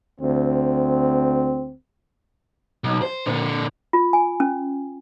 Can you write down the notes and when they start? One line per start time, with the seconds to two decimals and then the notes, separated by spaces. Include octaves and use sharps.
0.20 D2 C4
2.84 B1
3.02 C5
3.26 A#2 D3
3.93 F4
4.13 G#5
4.40 C#4